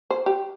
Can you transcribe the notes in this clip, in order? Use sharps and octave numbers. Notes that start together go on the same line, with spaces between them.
C5
G4